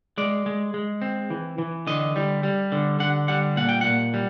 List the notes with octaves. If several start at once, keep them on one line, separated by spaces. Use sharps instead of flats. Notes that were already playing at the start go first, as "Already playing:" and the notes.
G#3 D5
G#3
G#3
C4
E3
E3
D3 D#5
G3
G3
D3
D3 F#5
G3 F#5
A#2 F#5
G5
A#2 F#5
G3